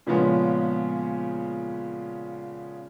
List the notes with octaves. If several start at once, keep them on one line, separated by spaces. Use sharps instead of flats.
A#2 C#3 F3 G#3 B3 C#4